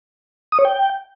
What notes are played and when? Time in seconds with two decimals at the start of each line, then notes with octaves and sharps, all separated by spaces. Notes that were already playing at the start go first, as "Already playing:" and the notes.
0.52 D#6
0.59 C#5
0.65 G5